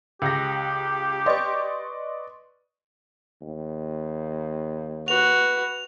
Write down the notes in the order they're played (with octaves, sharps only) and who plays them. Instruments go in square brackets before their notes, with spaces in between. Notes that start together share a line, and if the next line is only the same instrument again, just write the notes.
[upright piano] C#2 A#6 [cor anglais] G4
[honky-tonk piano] B4 D5 D#5 [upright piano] C6 C#6
[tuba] D#2
[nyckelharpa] F#4 [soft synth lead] B4 [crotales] F7